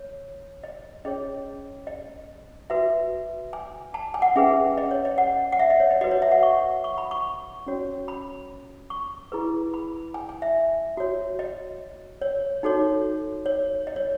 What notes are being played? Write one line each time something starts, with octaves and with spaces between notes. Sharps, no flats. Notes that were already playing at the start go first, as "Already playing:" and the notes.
Already playing: C#5
D#5
C#4 G#4 C#5 D#5
D#5
F#4 B4 E5
G#5
A5
G#5
F#5
C#4 G#4 B4 E5
D#5
C#5
D#5
F#5
F#5
E5
D#5
C#5
D#5
F#4 B4 D#5
C#5
E5
F#5
C#6
C#6
B5
C#6
C#4 F#4 C#5
B5
C#6
E4 G#4 B4
B5
G#5
G#5
E5
F#4 C#5
D#5
C#5
D#4 F#4 A4 C#5
C#5
D#5
C#5